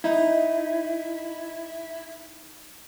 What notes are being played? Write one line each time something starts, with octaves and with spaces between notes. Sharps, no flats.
D#4 E4